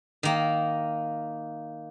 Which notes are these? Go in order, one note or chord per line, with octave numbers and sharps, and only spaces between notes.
D#3 A#3